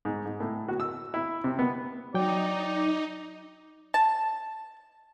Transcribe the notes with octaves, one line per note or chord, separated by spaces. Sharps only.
G#2
G#2
A2
F#4
E6
E4
C3
B3
F#3 D#4 D5 G5
A5